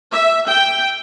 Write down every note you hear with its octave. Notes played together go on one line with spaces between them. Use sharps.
E5
G5